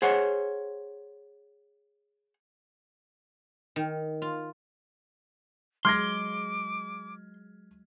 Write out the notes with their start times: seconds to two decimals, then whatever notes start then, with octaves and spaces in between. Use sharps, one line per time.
0.02 G#4 C5 C#5 F#5
3.76 D#3
4.22 F4
5.85 F#3 G#3 C6 D6 F6 G#6 A#6